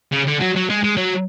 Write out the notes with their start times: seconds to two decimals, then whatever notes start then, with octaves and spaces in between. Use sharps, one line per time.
0.12 C#3
0.27 D3
0.40 F#3
0.56 F#3
0.70 G#3
0.83 G#3
0.97 F#3